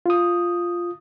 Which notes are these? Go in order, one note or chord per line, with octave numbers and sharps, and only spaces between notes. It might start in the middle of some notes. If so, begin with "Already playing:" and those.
F4 D#6